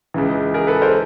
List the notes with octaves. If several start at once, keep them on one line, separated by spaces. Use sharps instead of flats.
C#2 C#3 E3
G#4 A#4
A4 B4
A#4 C5